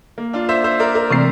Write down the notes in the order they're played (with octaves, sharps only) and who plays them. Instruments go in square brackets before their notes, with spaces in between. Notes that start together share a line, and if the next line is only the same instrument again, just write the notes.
[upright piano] A#3
D4 F4
C5 E5
C5 E5
A#4 D5
A#4 D5
[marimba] C3 E3 A3 C4